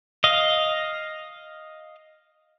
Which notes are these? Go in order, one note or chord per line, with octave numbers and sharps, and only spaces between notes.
D#5 F5